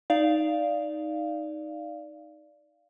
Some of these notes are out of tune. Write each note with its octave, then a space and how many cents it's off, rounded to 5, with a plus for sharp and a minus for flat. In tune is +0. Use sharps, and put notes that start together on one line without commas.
D#4 +0 D5 +0 F5 -10